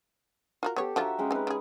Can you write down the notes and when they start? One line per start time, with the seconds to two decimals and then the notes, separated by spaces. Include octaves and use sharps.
0.63 F4 F#4 A#4
0.76 B3 G4 A4 C#5
0.96 D3 F3 F4 F#4 E5 A#5
1.18 G#3 C#4 G5
1.31 C4 D#4 B4 G#5
1.47 C#3 G#4